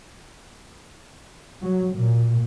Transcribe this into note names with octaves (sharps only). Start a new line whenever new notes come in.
F#3
A#2